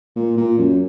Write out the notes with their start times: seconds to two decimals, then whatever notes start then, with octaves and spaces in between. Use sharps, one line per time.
0.16 A#2
0.37 A#2
0.58 F#2